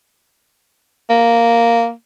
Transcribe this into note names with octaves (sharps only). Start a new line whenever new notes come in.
A#3